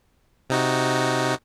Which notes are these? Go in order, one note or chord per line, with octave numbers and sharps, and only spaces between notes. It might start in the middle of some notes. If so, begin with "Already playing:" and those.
C3 D#4 F#4